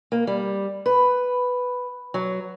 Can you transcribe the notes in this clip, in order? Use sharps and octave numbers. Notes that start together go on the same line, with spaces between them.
A#3
G3
B4
F#3